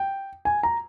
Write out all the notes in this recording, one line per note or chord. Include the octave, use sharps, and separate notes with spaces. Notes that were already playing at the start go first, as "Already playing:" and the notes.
Already playing: G5
G#5
A#5